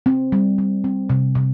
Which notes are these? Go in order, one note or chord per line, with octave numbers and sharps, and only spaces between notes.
C4
G3
G3
C4
C3
C3